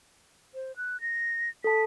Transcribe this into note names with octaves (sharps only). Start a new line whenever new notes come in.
C5
F#6
A#6
A4 A5 B6